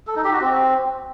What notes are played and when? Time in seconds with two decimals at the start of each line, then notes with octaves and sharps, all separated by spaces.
0.07 A4
0.16 D#4
0.24 G4
0.33 F#4
0.41 C4